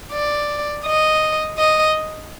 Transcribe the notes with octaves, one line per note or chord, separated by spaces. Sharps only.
D5
D#5
D#5